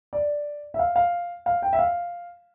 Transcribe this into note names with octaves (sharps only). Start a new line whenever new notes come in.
D5
E5
F5
F5
F5
G5
E5
F5